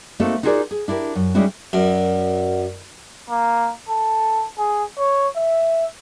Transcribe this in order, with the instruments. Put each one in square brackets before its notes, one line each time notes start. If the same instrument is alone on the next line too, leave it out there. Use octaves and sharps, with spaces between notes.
[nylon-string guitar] A3 A#3 C4 D#4 F#4 A4
D#4 F4 F#4 G#4 A#4 D5
G#4
D4 E4 G4 A#4
F#2
G3 G#3 C#4 D#4 E4 F#4
[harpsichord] F#2 [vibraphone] A#4 D5 F#5
[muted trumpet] A#3
A4
G#4
C#5
E5